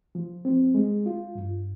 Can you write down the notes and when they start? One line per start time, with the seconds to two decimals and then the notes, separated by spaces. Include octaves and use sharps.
0.15 F3
0.45 C4
0.74 G#3
1.06 F4
1.35 G2